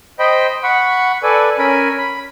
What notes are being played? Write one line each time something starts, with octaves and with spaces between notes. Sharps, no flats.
C5 D#5 G5 B5
F#5 B5 C#6
A4 B4 D5 G#5
C#4 A#4 G#5 B5
B5